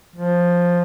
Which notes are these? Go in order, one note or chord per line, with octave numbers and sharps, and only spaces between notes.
F3